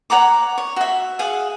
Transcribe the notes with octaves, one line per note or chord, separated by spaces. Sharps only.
C#5 F#5 A#5 D6
C#5
F#4 E5
G#4 F5 F#5